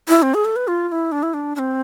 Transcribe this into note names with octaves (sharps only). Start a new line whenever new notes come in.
E4
C4
G#4
A4
B4
F4
F4
E4
D4
E4
D4
D4
C4